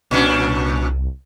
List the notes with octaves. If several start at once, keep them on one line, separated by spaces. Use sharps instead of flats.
C2 A#2 C#4 D4